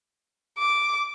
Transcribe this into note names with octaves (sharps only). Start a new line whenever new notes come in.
D6